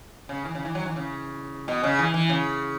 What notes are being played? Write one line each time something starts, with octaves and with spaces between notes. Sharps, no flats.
C#3
E3
C#3
E3
F#3
E3
C#3
B2
C#3
E3
E3
C#3